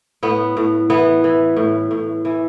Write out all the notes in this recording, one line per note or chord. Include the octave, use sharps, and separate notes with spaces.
A2 B3
A2
E3 B3
E3
A2
A2
E3